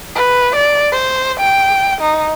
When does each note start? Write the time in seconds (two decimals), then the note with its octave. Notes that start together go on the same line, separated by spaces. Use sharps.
0.16 B4
0.56 D5
0.92 C5
1.40 G5
2.01 D#4